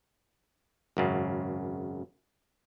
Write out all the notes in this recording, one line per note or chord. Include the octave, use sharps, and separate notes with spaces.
G#1 F#2 C#3